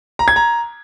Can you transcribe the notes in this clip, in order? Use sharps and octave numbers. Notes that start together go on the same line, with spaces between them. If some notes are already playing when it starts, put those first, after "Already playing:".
A#5
G#6
A#5